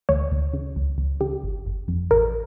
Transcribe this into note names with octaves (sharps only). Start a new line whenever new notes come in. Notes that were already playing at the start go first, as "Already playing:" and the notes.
D2 C#5
D2
C#3
C#2
C#2
C#3 G4
G1
G1
F2
A1 A#4